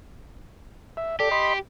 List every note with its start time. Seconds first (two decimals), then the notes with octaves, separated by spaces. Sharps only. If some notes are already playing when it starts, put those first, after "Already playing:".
0.97 E5
1.20 G4 A4 D5
1.31 D#5 B5 C6